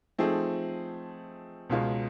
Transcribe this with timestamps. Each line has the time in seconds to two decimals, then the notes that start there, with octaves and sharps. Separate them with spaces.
0.19 F3 A3 C4 D#4 G#4
1.70 C#2 B2 G#3 C#4 F4